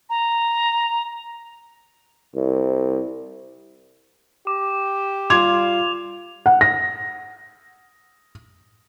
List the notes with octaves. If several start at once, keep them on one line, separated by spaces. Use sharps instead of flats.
A#5
C2
G4 D6
G3 F4 C6 D6 G#6 F7
F#5
A#6